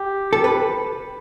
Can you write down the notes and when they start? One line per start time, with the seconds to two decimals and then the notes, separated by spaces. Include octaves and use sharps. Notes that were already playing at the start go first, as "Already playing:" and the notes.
Already playing: G4
0.33 A4
0.44 B4